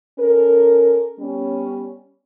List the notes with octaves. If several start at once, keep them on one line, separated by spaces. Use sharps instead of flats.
C#4 A4 A#4
G3 B3 C#4